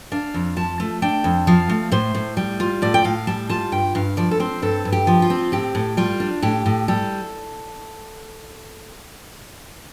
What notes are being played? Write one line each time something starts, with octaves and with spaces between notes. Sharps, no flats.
D4 F5
F2
F3 A5
A3
D4 G5
F2
F3 F5
A3
A2 C5
A2
G3
F4
A2 D5
G5
A2 F5
G3 A5
F4 A5
G2 G5
G2 F5
F3 D5
A4
C4 C5
G2 A4
G2
G4
F3
F4
C4
A2 G4
A2
G3 F4
D4
A2 G4
A2
G3 A4